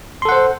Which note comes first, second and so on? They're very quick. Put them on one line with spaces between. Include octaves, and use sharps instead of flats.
C6 A4 F#5 C5